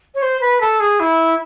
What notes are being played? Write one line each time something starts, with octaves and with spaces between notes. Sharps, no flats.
C#5
C5
B4
A4
G#4
E4